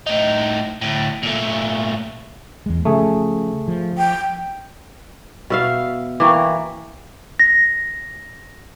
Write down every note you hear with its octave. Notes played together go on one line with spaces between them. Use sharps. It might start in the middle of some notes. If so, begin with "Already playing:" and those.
A2 D#4
D2 A2
A#2 A3
E2 G#3
C#3 F3 A3 G#4
F3
G5
B2 E5 F5
E3 A#3 G5 C#6 D6
A#6